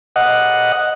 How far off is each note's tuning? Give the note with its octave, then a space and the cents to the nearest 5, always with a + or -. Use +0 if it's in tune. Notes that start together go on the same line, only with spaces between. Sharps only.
D#5 +0 F#5 +0